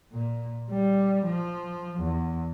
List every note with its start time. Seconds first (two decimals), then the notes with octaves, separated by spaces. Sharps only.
0.13 A#2
0.71 G3
1.25 F3
2.00 E2